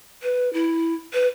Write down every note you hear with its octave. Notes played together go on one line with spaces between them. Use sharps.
B4
E4
B4